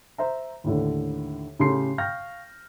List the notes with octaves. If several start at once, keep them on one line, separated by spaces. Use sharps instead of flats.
C5 E5 A#5
D#2 A2 D3
A2 C#3 G4 A4 C6 C7
F5 G5 C#6 F6 G6 A#6